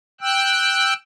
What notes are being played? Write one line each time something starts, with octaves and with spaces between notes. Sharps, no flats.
G5 E6 F#6